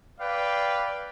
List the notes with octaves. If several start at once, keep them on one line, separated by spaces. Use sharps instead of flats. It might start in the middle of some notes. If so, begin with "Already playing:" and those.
B4 D5 F5 G5